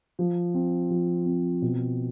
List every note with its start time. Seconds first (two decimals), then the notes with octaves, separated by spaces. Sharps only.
0.19 F3
0.54 C4
0.90 F3
1.26 C4
1.62 B2